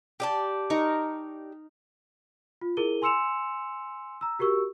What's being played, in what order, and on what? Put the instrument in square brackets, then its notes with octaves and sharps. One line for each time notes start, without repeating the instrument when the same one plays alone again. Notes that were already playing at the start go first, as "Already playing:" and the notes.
[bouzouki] G4 D5 A5
[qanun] D#4 A#4 C#6
[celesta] F4
E4 G#4 A#4 D#7 G7
G#5 C6 E6 C#7 E7 F7
A#5 E6
F#4 G4 A#4 C#6 E6